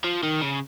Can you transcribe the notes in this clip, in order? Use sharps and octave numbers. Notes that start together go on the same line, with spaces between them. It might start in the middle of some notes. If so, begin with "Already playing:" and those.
F3
D#3
C#3